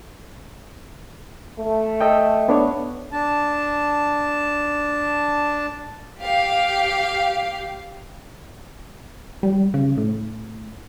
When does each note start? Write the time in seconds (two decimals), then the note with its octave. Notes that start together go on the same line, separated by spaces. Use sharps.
1.59 A3
2.01 A4 D#5 G5
2.49 B3 D4 C#5
3.12 D4 A5
6.22 G4 F5
9.43 G3
9.74 C#3
9.97 A2